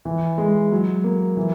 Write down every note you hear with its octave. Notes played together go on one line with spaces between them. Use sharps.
E3
G#3
F#3
A#3
E3